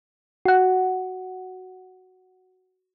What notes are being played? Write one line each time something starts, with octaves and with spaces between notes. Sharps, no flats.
F#4 F#5